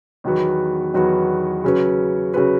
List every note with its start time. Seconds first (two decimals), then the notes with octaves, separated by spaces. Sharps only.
0.24 E2 D#3 F#3 B3 F#4
0.94 E2 D#3 F#3 B3 F#4
1.64 C#3 F#3 C#4 F#4 B4
2.34 C#3 F#3 C#4 F#4 B4